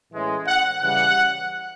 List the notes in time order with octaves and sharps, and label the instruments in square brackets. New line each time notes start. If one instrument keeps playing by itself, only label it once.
[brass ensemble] A2 E3 G#3 C#4
F#5
C#3 E3 G3 F#5